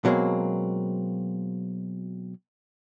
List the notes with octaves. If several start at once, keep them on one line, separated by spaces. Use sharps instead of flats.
B2 F#3 G#3 A#3 C4